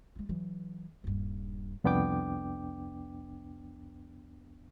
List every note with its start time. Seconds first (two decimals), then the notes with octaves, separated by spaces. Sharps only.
0.15 G#3 F4
0.29 E3 F#3
1.04 D#1 G2
1.84 C2 F2 B3 D4 G5 D6